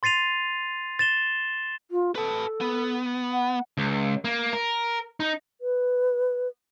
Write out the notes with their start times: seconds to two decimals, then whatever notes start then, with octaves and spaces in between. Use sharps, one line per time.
0.03 C6 A6 C7 D#7 F7
0.99 A6 E7 G7
1.91 F4
2.15 A4 B4 A5
2.61 B3
3.32 F#5
3.77 C#2
4.25 A#3
4.53 A#4
5.20 D#4
5.61 B4